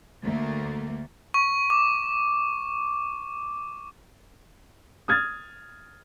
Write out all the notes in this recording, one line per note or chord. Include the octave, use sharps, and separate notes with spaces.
D2 A3 A#3
C#6
D6
D#6 F6 G#6 A6